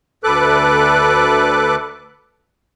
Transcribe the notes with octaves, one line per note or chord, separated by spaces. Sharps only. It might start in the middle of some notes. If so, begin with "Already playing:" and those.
D2 A4 B4 D6 F#6